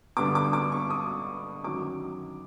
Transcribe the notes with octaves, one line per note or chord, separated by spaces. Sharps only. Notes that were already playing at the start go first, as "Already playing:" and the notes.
G2 D3 G3 B3 D6
D6
D6
C#6
D#6
F#2 D#3 F#3 D6